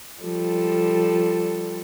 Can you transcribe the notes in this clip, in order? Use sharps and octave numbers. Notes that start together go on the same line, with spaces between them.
F3 G3 A4